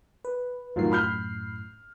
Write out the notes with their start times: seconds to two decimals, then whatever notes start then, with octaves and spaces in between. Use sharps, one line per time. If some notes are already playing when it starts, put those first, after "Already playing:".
0.25 B4
0.76 F#2 A2 D#3 F#3 F4 C7
0.92 B5 F6 G6